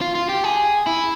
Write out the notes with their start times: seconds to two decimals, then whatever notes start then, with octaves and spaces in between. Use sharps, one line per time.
0.01 F4
0.15 F4
0.29 G4
0.44 G#4
0.87 E4